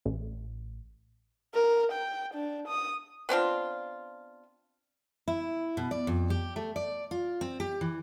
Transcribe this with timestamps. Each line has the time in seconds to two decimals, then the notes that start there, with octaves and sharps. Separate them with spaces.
0.05 A1
1.54 A#4
1.92 G5
2.34 D4
2.68 D#6
3.29 B3 C4 D4 F4
5.28 E4
5.77 B2
5.91 D5
6.07 F2
6.30 G4
6.56 A3
6.76 D5
7.11 F4
7.41 C4
7.60 G4
7.81 E3